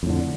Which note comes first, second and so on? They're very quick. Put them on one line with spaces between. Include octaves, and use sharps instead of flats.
F2 A2 D3